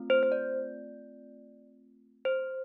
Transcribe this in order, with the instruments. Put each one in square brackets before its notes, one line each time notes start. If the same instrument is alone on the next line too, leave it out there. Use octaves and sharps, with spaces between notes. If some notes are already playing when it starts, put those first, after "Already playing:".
Already playing: [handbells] A3 C4 F4
C5
C5
D5
C5